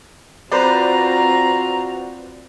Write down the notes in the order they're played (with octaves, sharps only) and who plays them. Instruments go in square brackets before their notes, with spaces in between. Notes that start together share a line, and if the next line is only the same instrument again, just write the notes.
[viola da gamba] C4 F4 [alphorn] F#4 [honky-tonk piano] B4 C5 D5 [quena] A#5